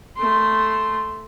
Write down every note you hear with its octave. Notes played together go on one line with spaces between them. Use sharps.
A3 C6